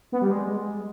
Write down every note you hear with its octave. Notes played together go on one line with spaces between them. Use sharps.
B3
G3
G#3